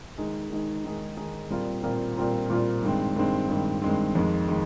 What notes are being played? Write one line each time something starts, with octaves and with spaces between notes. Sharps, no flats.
D#3 G#3 D#4 G#4
D#3 G#3 D#4 G#4
D#3 G#3 D#4 G#4
D#3 G#3 D#4 G#4
A#2 G3 C4 F4 A#4
A#2 G3 C4 F4 A#4
A#2 G3 C4 F4 A#4
A#2 G3 C4 F4 A#4
G2 D#3 G#3 C4
G2 D#3 G#3 C4
G2 D#3 G#3 C4
G2 D#3 G#3 C4
F2 D#3 G#3
D#3 G#3